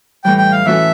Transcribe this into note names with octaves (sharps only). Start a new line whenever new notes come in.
A2 E3 G3 G5
G5
F5
E3 A3 C#4 F#4 A4 E5